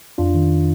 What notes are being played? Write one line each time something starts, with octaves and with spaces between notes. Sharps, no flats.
F2 D4 F4
D#3